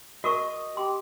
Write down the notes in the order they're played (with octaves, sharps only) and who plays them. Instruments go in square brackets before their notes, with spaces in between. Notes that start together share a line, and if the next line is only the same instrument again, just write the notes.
[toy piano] F#4 A#4 C#6 [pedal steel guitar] D#5 D#6
[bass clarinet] G4 [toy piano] C6